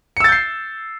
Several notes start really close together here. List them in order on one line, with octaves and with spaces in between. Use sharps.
C#7 E6 A6 G6 C7